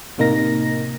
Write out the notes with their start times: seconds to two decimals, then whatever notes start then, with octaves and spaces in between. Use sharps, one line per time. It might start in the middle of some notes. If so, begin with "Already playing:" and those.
0.18 A2 C3 A#3 D#4 A#4 A#6